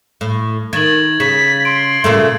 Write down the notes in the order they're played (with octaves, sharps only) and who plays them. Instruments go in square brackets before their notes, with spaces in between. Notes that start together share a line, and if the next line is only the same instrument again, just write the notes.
[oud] A2
[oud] D#3 [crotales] G#6 A6 F#7
[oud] C#3 [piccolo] B6
[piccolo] C6 [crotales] D7
[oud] A#2 C#3 A3